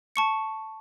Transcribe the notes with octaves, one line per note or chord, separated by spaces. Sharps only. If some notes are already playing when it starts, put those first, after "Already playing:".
A5 C#6 C#7